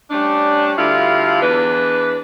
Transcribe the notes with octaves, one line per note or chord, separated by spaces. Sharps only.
G3 A3 C#4 D4
D2 D3 G3 E4 F4 F5
E2 D4 B4